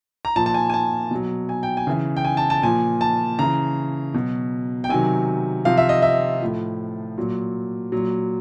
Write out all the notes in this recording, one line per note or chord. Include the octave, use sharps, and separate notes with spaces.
A#5
A#2 F3 A5
A5
G#5
G#5
A5
B2 F#3
G#5
G5
G#5
C#3 E3
G5
G#5
A5
A5
A#2 F3 G#5
A5
C#3 E3 A#5
B2 F#3
G5
C3 D#3 F#3 G#5
C3 F3 F5
E5
D#5
E5
A2 F3
A#2 F#3
A#2 F#3